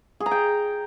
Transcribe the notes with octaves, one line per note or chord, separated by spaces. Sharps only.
G#4
A#5
G5